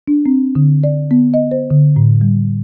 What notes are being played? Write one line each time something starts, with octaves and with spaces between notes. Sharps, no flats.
D4
C4
D3
D5
B3
D#5
C5
D3
A2
G3